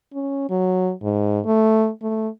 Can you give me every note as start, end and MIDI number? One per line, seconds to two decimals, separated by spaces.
0.14 0.47 61
0.50 0.92 54
1.03 1.40 44
1.45 1.90 57
2.02 2.28 57